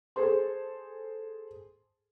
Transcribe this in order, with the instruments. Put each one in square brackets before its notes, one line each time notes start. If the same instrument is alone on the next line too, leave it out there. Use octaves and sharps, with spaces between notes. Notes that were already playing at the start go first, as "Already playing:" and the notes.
[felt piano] G#4 A4 C5 C6